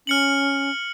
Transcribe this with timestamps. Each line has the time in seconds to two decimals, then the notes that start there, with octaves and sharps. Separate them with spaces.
0.07 C#4 F6 C#7 F#7